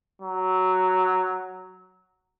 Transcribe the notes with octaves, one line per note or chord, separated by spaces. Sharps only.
F#3